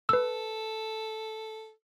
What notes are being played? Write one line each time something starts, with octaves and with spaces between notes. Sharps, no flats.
A4 B4 E6